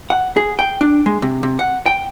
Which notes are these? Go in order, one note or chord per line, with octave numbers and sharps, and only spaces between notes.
F#5
G#4
G5
D4
G#3
C3
C3
F#5
G5